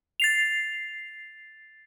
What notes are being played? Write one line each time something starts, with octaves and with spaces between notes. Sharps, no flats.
A6 C7 F7